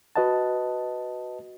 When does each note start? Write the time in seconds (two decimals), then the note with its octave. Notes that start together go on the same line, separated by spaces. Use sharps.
0.16 F#4 B4 D#5 F#5 A5